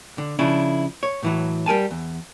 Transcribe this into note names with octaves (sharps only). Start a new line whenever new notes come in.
D3
C#3 F3 D4 E4
C#5
A2 E3 F#3
G3 A#4 G#5 A5
E2